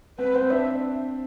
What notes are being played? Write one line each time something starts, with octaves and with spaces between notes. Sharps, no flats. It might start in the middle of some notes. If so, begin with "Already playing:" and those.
C4 B4
C4 C5
D4 E5